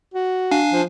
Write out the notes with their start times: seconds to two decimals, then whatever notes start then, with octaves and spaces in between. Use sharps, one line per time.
0.14 F#4
0.51 D4 F5 G#5
0.73 F3